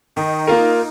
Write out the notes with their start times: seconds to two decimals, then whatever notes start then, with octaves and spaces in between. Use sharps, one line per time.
0.16 D#3 D#4
0.47 A#3 F4 A#4